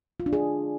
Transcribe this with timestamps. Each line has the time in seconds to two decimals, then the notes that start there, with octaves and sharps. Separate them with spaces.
0.20 F4
0.26 D4
0.33 G#4